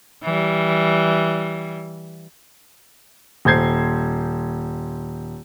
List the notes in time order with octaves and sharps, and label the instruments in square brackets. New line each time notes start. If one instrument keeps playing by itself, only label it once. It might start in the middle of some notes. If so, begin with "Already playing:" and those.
[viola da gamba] E3 G3
[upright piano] D#1 C5 G6 G#6 C7